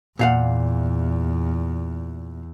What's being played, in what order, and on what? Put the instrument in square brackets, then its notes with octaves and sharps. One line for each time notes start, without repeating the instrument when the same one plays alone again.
[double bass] E2 [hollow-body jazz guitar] A#2 F5 F#5